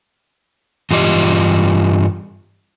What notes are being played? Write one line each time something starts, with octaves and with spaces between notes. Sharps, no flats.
G2 E3 F4 G4 D#5